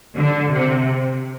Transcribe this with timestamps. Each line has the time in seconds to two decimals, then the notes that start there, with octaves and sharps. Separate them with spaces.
0.17 D3
0.54 C3